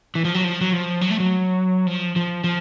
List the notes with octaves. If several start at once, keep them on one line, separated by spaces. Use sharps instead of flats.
E3
F3
F#3
F3
F#3
F3
F#3
A3
F#3
F3
F3
F3